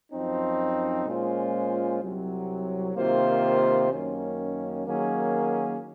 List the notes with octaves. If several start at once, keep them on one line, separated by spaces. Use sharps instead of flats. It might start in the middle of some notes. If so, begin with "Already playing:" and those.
F#2 F3 C4 D#4
A#2 G#3 C#4 F4 C5
C2 C3 F#3
C3 D#3 A#3 F4 C5
F#2 D#3 A#3 C#4
D#3 F#3 A#3 C#4 G#4